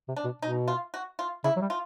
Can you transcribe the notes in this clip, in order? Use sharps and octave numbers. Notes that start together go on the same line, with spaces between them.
C3
D4
B2
B2 D#4
F4
F#4
F4
C#3 E4
F#3
G3
F4